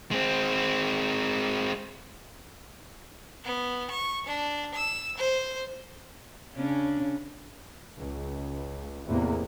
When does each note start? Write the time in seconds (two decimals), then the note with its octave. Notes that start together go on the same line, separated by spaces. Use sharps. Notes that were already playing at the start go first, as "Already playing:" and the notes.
0.11 G#3 C4
3.44 B3
3.91 C#6
4.26 D4
4.75 E6
5.17 C5
6.56 C#3 C#4 D4
7.98 C#2
9.06 A1 E2 C3 A#3